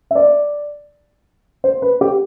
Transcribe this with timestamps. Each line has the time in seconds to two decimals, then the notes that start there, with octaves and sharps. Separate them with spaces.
0.11 E5
0.15 D5
1.64 C5
1.82 B4
2.01 G4